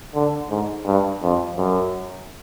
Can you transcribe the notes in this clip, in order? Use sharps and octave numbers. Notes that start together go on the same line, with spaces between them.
D3
G#2
G2
F2
F#2